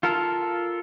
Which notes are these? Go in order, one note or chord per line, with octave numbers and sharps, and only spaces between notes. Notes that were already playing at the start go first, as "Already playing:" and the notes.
F4 A4 A#4